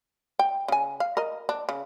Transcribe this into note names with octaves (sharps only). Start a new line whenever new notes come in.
G5
C#3 G#5
F5
A#4 D#5
D4
C#3